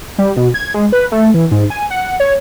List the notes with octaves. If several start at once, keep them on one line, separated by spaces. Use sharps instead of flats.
G3
B2
G#6
G#3
B4
A3
E3
G#2
G#5
F#5
C#5